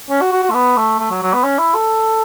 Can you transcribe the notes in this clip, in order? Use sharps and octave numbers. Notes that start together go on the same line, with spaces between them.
C#4
F#4
F#4
F#4
A3
B3
A3
A3
F#3
F#3
B3
C#4
E4
A4